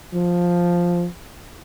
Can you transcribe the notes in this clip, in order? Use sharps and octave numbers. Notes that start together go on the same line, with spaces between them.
F3